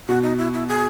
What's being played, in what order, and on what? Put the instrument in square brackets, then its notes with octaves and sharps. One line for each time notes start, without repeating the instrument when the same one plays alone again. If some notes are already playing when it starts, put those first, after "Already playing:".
[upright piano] B2 [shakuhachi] F#4
[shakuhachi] D#4
E4
E4
G#4